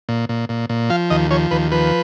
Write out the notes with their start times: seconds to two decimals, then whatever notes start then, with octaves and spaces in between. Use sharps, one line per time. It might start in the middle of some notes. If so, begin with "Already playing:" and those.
0.09 A#2
0.29 A#2
0.49 A#2
0.69 A#2
0.90 F3 F5
1.10 D#2 D#5
1.31 F3 C#5
1.51 D#2 B4
1.71 F3 B4